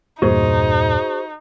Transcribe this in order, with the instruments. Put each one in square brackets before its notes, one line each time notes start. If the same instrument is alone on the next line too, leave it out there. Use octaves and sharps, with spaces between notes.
[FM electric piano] E2 G2 A#2 [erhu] D#4 [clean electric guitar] F#4 G#4 C5